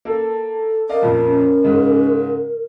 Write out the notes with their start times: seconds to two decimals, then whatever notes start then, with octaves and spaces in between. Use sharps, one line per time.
0.05 A#3 A4
0.89 A#4 D5 D#5 F5
1.02 F2 A#2 F3
1.27 C#4
1.63 G#2 C#3 G#3